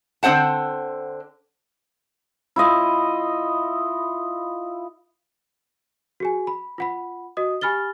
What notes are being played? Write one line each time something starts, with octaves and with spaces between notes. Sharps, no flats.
D3 C4 C5 F#5 A5
E4 F4 D#5
F#4 G#4 G#5
B5
F4 F#5 B5
F#4 D#5 D#6
G4 G#5 B5 F6 A6 G7